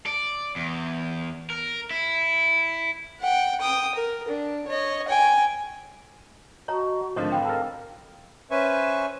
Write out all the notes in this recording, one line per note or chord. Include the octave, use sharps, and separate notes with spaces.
D5
E2
A#4
E4
F#5 G5
G5 D#6
A#4
D4
C#5 D#5
G5 G#5
F#4 C#5 D#5 A5 A#5
G#1 D3 F3 G#3 C#5 D#5 A5
F5 G5 B5
A4 A#4
C#4 B4 C5 E5 G#5 C#6